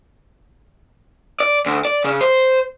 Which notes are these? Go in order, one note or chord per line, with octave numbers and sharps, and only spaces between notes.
D5
D2
D5
C#3
C5